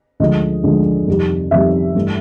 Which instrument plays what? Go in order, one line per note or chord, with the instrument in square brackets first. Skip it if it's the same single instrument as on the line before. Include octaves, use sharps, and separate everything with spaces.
[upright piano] D2 D3 F3 G#3 D#5
D2 D3 F3 G#3
F2 C3 D#3 G3
F2 C3 D#3 G3 E5
G2 E3 A3